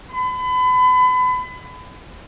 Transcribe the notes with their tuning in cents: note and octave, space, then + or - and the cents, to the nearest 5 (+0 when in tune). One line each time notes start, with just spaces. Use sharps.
B5 +35